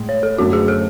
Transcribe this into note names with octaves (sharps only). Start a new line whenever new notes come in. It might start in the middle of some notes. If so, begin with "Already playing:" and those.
Already playing: A2 G#3 G#4
C#5
A4
F#2 D3 A3 F#4
G#4
A4